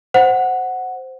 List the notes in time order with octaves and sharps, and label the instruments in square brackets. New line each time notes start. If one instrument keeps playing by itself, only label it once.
[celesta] C5 F#5